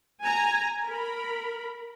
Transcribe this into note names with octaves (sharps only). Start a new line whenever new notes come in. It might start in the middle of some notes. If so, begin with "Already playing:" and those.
G#5 A#5
A#4 B5